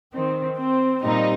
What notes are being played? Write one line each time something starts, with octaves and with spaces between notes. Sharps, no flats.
D#3 C4
C4
A#2 G3 C4 D#4